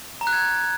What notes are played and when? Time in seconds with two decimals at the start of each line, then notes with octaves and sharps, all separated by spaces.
0.21 A#5
0.27 F#6
0.33 G#6